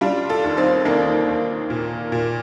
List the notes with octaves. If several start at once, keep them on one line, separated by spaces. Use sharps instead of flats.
G3 D4 F4
F4 A4
D#2
C4 D#4
D#2 A#3 D4
D#2
A#2
A#2